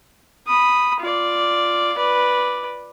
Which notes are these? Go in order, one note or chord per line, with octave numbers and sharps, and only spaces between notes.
B5 D#6
F4 D5
B4 D5